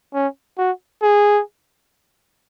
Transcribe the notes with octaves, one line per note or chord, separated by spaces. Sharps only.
C#4
F#4
G#4